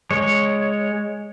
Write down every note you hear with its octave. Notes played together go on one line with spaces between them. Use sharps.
G#3 C#5